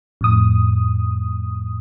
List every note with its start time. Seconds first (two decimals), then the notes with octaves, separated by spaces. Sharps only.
0.21 F2 A2 D#6